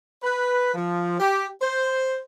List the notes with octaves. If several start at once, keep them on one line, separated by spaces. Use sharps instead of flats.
B4
F3
G4
C5